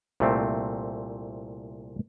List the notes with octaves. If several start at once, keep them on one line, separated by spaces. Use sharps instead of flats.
C2 A#2 A3 C4